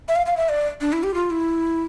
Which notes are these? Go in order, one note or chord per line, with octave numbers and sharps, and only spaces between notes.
E5
F5
F5
E5
D5
D4
E4
G4
F4
E4